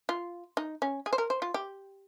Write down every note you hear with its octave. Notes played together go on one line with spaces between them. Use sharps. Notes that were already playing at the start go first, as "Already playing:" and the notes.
F4
D#4
C#4
G#4
C5
A#4
C5
F4
G4